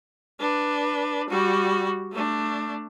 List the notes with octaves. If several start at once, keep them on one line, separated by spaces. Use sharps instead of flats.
D4 B4
G3 F#4
A3 D4